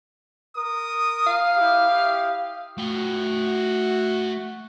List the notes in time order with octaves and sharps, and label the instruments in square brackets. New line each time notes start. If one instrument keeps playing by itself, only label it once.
[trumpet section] A#4 D#6
[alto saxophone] F5
[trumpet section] E4 G4
E4 G4 D#6
[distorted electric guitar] A3 G5 [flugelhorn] F#4